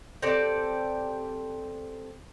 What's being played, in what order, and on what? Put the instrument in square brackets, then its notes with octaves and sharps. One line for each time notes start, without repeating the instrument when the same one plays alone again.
[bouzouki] C4 G4 A4 D5